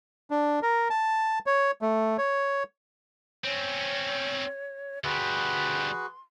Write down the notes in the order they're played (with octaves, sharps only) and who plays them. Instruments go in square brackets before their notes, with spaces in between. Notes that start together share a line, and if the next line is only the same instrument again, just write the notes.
[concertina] D4
A#4
A5
C#5
A3
C#5
[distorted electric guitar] C4 C#4 [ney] C#5
[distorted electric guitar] D2 G3 [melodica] F#4 G#4 B4 [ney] C6